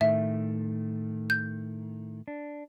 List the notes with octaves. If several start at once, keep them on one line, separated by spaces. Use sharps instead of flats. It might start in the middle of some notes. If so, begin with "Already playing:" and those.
A2 D#3 A3 E5
G6
D4